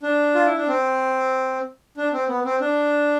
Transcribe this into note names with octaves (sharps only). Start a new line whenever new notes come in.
D4
F4
E4
D4
C4
D4
C4
B3
C4
D4